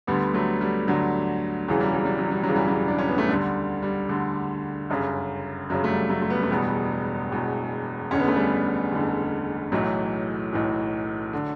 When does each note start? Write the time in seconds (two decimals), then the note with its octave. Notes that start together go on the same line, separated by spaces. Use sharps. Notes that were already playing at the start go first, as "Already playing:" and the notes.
0.07 D2 D3 G3 B3
0.34 F#3 A3
0.61 G3
0.88 D2 D3 F#3
1.68 E1 E2 C#3 E3 F#3
1.80 G3
1.93 F#3
2.05 G3
2.18 F#3
2.31 G3
2.43 F#3
2.49 E1 E2 C#3 E3
2.56 G3
2.68 F#3
2.88 D4
2.98 C#4
3.08 B3
3.18 A3
3.28 D2 D3 G3
3.82 G3
4.09 D2 D3
4.90 G1 F#2 C#3
5.70 G1 F#2 C#3 F#3
5.84 A3
5.90 G3
6.10 F#3 A3
6.22 A3
6.30 G3 B3
6.43 A3
6.50 E1 E2 B2 G3 B3
7.31 E1 E2 B2
8.11 F#1 E2 D3 C#4
8.19 B3
8.28 A3
8.36 G3 B3
8.91 F#1 E2 D3
9.72 B1 A2 E3 F#3 A3
10.53 B1 A2 E3
11.33 D3